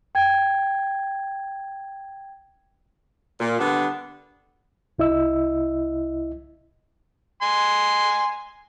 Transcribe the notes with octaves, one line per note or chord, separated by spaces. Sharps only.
G5 G#6
A#2
D3 G3 B3 D4
C2 E4 D#5 E6
G#5 C6